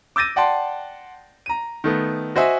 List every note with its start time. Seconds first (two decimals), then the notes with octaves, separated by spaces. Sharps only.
0.16 D6 E6 G6 A6 A#6 D#7
0.36 D5 F#5 G5 A5 C6
1.46 A#5 D#7
1.84 D#3 A3 B3
2.36 F#4 C5 D#5 E5 G#5